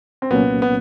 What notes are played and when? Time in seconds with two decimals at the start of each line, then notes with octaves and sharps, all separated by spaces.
0.22 C4
0.31 C2 A#2 F#3 A#3 B3 C#4
0.62 B3